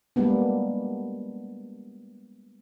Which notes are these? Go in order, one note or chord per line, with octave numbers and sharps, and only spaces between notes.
G3 G#3 A#3 B3 D4